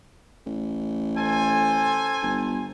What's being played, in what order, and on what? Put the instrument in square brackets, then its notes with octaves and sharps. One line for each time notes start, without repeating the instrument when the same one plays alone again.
[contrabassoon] A1
[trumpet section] A4 C5 G#5
[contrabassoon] G1